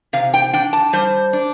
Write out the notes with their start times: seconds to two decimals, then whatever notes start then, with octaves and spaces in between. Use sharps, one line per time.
0.13 C3 F5
0.34 G5
0.53 D4 G5
0.73 A5
0.93 G3 C5
1.33 D4